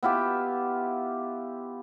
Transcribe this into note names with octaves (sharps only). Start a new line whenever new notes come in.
B3 E4 F4 G4